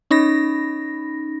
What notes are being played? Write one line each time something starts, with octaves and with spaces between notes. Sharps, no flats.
C#4 D#4 B5 A#6